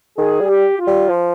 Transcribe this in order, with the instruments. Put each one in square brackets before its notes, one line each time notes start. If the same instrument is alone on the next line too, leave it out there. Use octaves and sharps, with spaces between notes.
[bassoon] D#3 [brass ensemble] G#4
[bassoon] G3
[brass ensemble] G4
F4
[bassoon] G3
F3